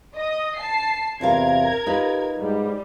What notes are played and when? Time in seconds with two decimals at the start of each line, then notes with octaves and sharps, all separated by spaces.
0.15 D#5 D#6
0.57 A5 C7
1.21 E2 C3 F4 A#4 F5 G#6
1.86 D#4 F4 G4 B4
2.40 G#2 G3